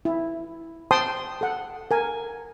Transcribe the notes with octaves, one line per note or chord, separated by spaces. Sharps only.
E4
C5 G5 A5 C6 D#6
A4 F#5
A#4 G#5